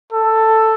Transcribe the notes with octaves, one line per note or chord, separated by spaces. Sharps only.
A4